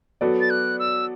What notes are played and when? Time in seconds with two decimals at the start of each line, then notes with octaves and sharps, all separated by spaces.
0.21 F#3 B3 F#4 A4 D5
0.41 A6
0.50 F#6
0.79 E6